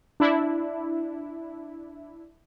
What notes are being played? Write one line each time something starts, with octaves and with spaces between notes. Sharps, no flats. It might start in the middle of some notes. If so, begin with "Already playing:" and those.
D4 E4